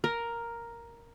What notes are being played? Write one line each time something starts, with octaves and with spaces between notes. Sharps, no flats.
A#4